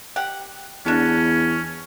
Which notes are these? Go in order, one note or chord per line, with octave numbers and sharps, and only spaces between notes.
G4 F#5
E2 D3 C#4 D4